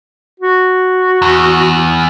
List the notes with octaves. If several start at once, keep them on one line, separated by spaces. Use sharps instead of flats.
F#4
E2